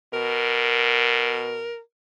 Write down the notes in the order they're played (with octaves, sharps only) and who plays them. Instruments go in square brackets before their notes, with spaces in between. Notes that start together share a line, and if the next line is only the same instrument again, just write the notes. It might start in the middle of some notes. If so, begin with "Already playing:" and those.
[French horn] B2 [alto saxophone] A#4